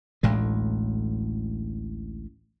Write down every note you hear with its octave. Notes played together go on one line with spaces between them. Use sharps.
A1 D2 A2 G#3